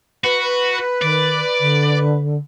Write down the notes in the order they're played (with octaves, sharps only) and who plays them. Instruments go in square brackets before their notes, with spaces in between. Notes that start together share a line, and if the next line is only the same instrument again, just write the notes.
[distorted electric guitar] F#4 [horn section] B4
[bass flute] D#3 [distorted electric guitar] D5
[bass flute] D3